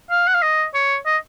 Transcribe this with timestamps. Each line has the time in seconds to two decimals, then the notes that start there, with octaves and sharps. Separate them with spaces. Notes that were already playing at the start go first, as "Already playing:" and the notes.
0.10 F5
0.27 F#5
0.34 F5
0.42 D#5
0.74 C#5
1.06 D#5